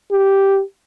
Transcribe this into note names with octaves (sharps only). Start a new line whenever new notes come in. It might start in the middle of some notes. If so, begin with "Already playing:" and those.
G4